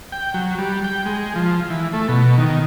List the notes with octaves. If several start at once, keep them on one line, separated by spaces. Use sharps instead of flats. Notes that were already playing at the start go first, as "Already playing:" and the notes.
G5
F#3
G3
G5
G#3
F3
E3
A3
B2
D#3